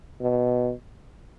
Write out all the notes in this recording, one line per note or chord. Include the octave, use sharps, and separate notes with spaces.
B2